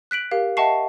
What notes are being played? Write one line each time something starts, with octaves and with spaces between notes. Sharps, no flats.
F#6 B6 D7 F#7
G4 A#4 F5
D#5 E5 F#5 A5 C#6 C7